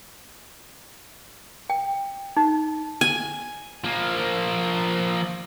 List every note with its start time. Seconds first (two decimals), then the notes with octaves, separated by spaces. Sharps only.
1.70 G5
2.37 D#4
3.01 G#5
3.84 F3 A#3